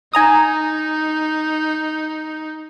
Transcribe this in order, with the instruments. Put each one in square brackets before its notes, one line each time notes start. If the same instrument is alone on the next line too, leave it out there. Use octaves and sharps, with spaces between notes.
[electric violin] D#4 [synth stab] G#5 A#5 D#6